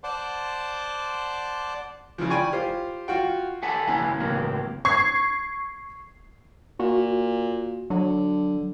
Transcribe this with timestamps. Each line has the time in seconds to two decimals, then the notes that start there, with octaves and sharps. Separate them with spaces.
0.04 C5 D5 F#5 A5 C6 D6
2.18 C#3 E3 F3
2.30 D5 G5 G#5 B5 C#6
2.53 F4 G4 C5
3.08 F4 F#4 F#5 G5
3.63 A4 E5 F#5 G#5 A5
3.88 C#2 A#3 C#4 E4 G#5 A#5
4.19 C#2 A2 F#3 A#3 C4
4.85 C#6 G#6 C7
6.79 A#2 F#4
7.90 D3 F#3